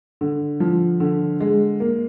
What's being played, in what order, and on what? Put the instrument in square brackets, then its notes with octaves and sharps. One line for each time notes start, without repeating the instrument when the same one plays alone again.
[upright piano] D3
F3
D3
G#3
A#3